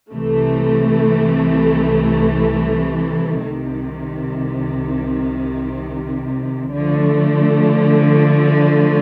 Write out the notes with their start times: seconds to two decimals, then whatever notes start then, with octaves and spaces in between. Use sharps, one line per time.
0.12 C2 C3 E3 A3
3.42 C2 C3 D#3
6.73 D3 F3 A3